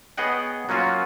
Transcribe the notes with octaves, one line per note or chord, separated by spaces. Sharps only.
B3 G#4 C#5 D#5 F#5 G5
F#3 A#3 C#4 F4 F#4